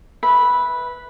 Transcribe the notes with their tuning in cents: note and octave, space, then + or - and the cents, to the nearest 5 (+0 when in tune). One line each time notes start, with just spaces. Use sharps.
B4 -5 E5 -15